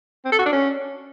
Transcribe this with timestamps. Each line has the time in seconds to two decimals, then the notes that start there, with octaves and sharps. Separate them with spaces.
0.25 C4
0.32 A4
0.39 F#4
0.46 D4
0.53 C#4